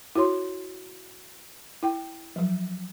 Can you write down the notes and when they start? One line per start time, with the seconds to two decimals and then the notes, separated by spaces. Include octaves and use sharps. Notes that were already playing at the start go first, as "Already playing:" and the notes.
0.16 E4 F#4 C#5 C6
1.83 E4 G5
2.36 F3 F#3